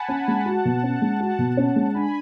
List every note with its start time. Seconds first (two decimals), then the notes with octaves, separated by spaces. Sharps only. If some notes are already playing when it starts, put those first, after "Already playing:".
Already playing: F#5 G#5 A5 B5
0.09 C#4
0.28 G#3
0.46 F#4
0.65 B2
0.83 C#4
1.02 G#3
1.20 F#4 F#5 A5
1.39 B2
1.57 C#4
1.76 G#3
1.94 D4 G#5 B5